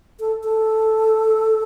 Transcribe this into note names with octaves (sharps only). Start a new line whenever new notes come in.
A4
A4